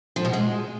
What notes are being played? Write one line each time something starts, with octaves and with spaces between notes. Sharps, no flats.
F3
B2
G#3